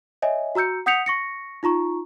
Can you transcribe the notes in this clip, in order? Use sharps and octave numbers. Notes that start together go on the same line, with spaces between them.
C#5 D#5 E5 G#5
F#4 A#5 E6 G6 C#7
F#5 D#6 G6 B6 C#7 F7
C#6 A#6 C#7
D#4 F4 A#5 C#6